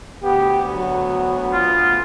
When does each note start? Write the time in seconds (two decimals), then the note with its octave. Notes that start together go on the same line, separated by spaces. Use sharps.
0.23 D2 B3 G4
0.75 F#3
1.53 F4